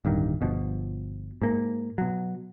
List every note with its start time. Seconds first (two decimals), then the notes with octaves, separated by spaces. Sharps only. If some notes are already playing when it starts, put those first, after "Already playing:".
0.05 D1 G2 D#3
0.41 G1 B2 F3
1.42 G#2 A#3
1.98 B2 F#3